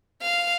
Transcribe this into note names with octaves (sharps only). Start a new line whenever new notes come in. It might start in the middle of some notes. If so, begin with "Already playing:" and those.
F5